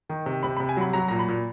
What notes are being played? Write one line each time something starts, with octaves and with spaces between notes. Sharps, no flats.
D#3
C3
C3 B5
B5
C3
G#5
F#3 B5
F#3 A#5
A#2 A#5
B5
A#2